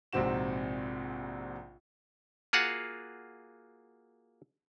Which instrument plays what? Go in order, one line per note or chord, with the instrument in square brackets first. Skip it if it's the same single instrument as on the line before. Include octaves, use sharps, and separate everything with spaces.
[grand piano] A#1 G#2 C3 C4 F#4 E7
[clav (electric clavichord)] A#3 F4 F#4 G#4 F5 F#5